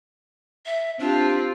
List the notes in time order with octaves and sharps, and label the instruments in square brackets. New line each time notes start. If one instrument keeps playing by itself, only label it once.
[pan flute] E5
[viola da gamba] C4 F4 G4 [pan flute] D4